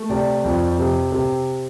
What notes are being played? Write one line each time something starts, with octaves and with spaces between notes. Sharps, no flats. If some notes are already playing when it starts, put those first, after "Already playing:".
Already playing: A3
C3 D5
F2
C3
C3